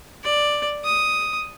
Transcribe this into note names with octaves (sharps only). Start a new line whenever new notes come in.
D5
D#6